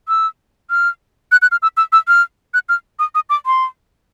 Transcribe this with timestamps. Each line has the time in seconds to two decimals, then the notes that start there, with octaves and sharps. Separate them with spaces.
0.08 E6
0.70 F6
1.32 F#6
1.42 F#6
1.51 F6
1.62 E6
1.77 E6
1.92 E6
2.08 F6
2.54 F#6
2.69 F6
2.99 D#6
3.15 D#6
3.30 D6
3.46 C6